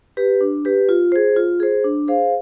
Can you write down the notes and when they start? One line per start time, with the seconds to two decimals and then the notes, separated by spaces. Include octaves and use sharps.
0.17 G4 B4
0.41 D4
0.65 G4 B4
0.89 F4
1.12 G#4 C5
1.36 F4
1.60 G#4 C5
1.84 D4
2.08 G#4 C5 F5